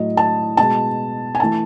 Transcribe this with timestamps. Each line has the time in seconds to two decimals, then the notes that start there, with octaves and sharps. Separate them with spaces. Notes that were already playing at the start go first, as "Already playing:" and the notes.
Already playing: A2 F#3 A3 D#5
0.17 A5
0.57 B2 G#3 A5
1.35 G#5
1.40 E3 A3 A5